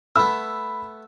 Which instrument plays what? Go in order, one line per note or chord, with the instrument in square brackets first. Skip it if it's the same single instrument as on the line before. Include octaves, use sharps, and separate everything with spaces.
[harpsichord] A3 B3 [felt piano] B5 E6